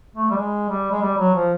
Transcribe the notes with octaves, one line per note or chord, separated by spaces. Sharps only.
A3
G3
G#3
G3
G#3
G3
F#3
F3